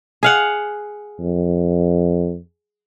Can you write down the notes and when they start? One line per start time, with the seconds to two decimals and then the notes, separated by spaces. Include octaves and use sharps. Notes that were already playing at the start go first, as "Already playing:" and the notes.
0.23 G#4 F5 F#5
1.20 F2